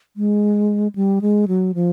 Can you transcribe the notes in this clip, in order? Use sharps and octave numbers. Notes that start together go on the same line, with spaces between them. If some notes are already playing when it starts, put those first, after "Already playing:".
G#3
G3
G#3
F#3
F3